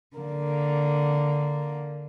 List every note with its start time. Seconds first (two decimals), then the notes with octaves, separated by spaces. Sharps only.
0.15 D3 A#3